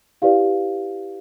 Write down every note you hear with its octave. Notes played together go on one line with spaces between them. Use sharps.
E4 G4 B4 D5 F5